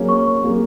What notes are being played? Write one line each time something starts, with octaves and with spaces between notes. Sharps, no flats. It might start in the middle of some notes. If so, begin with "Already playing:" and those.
Already playing: F#3 A#3 C#4 G#4
C#6
F#3 A#3 C#4 G#4